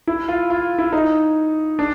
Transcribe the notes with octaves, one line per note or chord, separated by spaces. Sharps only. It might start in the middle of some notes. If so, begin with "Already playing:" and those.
E4
F4
F4
E4
D#4
D4